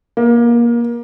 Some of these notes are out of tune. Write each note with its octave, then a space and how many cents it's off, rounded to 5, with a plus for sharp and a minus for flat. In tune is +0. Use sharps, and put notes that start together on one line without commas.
A#3 +25